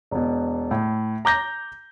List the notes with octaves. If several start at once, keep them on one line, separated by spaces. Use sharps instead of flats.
E1 B2
A2
A#5 D6 G6 A#6